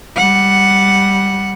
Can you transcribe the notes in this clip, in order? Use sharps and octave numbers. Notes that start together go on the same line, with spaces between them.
G3 F#5